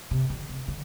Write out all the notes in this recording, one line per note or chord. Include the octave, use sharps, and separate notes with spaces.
C3
D3
C3
D3